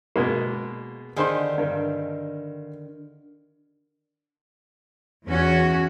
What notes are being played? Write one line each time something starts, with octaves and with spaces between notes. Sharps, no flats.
B2 G#3 A#3
D3 D#3 G4 G#4 C5 C6
G2 A#4
E2 C#4 F#4